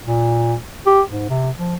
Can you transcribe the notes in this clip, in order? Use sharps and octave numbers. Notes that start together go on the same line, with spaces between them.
A#2
G4
G#2
C3
F3